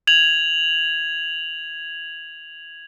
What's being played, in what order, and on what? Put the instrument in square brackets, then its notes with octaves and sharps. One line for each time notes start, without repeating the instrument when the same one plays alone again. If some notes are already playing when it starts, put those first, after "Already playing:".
[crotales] G#6 F7 F#7